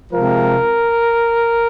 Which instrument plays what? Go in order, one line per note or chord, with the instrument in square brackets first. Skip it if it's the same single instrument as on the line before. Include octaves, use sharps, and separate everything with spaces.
[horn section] C3 F3 G#3 A#4